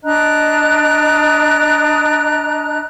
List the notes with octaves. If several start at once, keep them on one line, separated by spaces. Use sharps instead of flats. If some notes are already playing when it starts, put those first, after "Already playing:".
D4 D#5 A#5 F#6